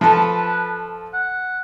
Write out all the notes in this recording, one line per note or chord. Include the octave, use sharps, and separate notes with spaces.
F3 A4 B4
F#5